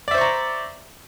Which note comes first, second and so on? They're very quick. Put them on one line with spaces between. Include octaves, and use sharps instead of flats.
D5 E5 C5 C#6 A#5